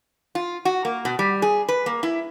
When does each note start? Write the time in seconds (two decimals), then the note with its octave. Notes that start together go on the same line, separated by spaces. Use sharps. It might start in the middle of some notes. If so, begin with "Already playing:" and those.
0.35 F4
0.65 F#4
0.85 A#3
1.05 B2
1.19 G3
1.42 G#4
1.68 B4
1.86 A#3
2.03 E4